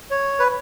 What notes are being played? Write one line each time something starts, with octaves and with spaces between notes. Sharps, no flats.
C#5
B4